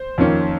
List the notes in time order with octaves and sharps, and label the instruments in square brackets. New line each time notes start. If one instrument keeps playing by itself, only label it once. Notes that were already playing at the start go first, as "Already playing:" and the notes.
Already playing: [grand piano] C5
F2 D#3 A#3 C#4